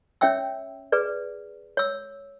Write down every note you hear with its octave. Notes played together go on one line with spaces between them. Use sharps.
C#4 C#5 E5 G5 E6
G#4 B4 D5
C#5 E6